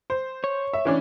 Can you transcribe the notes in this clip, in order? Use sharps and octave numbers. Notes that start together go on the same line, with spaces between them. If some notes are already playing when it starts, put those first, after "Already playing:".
C5
C#5
E5
E3 C#4 D4